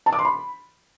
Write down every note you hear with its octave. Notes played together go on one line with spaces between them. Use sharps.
A5
D6
C6
B5